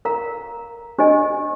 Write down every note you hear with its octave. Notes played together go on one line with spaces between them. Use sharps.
A#4 F5 A#5
D4 G4 C5 D#5 G#5